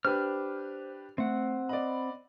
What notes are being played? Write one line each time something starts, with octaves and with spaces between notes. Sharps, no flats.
D4 G4 B4 C5 F6
A3 C4 F#5
D5 D#5 B5